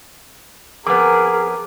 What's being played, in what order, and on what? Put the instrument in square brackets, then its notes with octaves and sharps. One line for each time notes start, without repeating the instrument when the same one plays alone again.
[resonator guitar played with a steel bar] F2 B3 [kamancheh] G#4 A#4 [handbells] D6